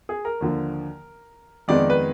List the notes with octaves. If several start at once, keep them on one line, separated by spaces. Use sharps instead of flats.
G#4
A#4
D#2 D3 F3
F2 D#3 G#3 B3 D5
B4